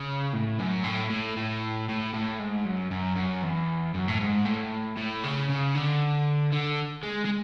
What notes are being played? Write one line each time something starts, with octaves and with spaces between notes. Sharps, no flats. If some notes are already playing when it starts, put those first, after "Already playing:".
Already playing: C#3
A2
F#2
A2
A2
A2
A2
A2
G#2
F#2
F#2
F#2
E2
F#2
A2
G#2
A2
A2
C#3
C#3
D3
D3
G#3
G#3